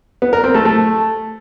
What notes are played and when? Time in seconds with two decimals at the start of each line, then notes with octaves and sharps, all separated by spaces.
0.22 B3
0.33 A#4
0.44 C4
0.55 A3
0.65 A3